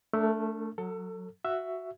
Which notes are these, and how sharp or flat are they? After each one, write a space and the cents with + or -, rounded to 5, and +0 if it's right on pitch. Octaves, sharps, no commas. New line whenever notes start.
A3 +0 D4 -20 A#4 -40
F#3 -10 A4 +25
F#4 +0 E5 +10